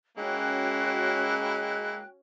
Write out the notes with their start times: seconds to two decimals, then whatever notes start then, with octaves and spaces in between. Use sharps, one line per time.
0.17 G#3 A#3 C#4 E4 F#4 G5 F#6